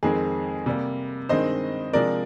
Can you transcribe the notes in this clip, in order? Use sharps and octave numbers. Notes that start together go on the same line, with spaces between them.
F2 D#3 G#3 C4 G#4
C3 G3 A#3
G2 D#3 G#3 C4 C5 D#5
C3 F3 G#3 D4 A#4 D5